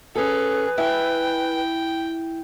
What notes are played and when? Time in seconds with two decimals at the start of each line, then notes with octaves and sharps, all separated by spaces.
0.16 C#4 G#4 A4 B4
0.78 E4 E5 G5 G#5